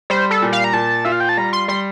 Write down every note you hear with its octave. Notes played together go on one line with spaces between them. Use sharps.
G3 C5
A4
A#2
F5
A#5
A#2 A5
F4 E5
F5
G5
A5
G3 A#5
C6
G3 C6